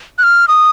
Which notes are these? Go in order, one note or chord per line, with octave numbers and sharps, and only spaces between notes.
F#6
F6
D#6